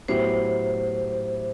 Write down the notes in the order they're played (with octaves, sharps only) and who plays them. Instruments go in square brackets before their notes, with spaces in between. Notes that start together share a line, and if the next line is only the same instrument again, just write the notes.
[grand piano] A2 F#3 B3 E4 G4 [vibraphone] C5